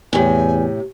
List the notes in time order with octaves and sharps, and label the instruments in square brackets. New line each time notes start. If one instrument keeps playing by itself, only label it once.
[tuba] E2 [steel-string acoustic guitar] A2 C3 [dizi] G#5